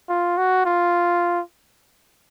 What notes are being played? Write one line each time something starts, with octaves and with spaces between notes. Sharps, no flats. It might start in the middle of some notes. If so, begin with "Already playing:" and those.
F4
F#4
F4